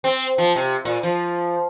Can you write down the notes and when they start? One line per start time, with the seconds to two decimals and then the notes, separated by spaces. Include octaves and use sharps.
0.04 C4
0.38 F3
0.56 C3
0.85 A#2
1.03 F3